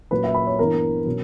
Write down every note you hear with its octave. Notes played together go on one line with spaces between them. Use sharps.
A#2 F#3 C#4 B4
E5
B5
C#5
G2 E3 B3 A#4
B2 F#3 C#4